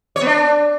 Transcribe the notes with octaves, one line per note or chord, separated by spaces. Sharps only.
C#5
B3
D4